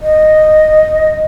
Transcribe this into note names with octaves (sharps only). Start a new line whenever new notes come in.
D#5